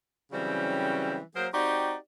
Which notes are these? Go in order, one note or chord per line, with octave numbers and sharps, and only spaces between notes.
C#3 E3 F#3 G3 C4 C#4
F#3 A#3 G#4 A#4 C5
C4 D#4 F#4 G4 D5